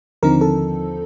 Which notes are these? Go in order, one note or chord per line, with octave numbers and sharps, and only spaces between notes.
D#2 D3 F3 C4 D#4 A#4
A4